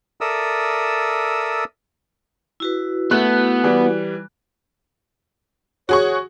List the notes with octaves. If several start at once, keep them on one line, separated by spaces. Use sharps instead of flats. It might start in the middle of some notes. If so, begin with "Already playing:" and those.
A4 A#4 D5 E5 D#6 E6
E4 F#4 B4
A3 B3 F#6
E3 G3
F#4 G#4 C#5 C#6